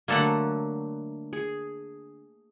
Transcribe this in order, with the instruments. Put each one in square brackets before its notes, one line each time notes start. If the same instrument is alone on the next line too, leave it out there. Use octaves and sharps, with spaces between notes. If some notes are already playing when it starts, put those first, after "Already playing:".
[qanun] D3 F#3 A3 [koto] A#3 A4 F#5
[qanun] G#4